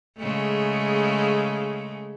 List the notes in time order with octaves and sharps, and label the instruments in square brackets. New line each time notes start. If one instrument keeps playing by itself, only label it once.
[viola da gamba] C#3 G#3 A3